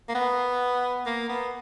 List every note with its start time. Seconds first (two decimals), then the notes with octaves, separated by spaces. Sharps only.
0.09 A#3
0.15 B3
1.07 A#3
1.30 B3